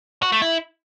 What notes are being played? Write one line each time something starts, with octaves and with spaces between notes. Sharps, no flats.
F#4
A3
E4